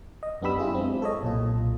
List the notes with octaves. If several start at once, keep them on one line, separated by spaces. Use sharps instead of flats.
D#5
F#2 B3 D4 G4 B5 E6
D4 E4 F4 G#4
G#3 C4
A4 C#5 D#5
B1 A#2 F4